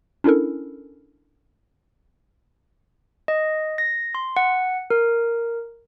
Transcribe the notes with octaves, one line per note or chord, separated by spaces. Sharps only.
C#4 D4 E4 A4 A#4
D#5
A#6
C6
F#5
A#4